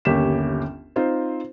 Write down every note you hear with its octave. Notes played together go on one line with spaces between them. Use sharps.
G1 D#2 C#4 G4 B6 E7
C4 D#4 F4 C5